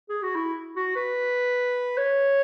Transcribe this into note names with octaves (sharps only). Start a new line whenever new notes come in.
G#4
F#4
E4
F#4
B4
C#5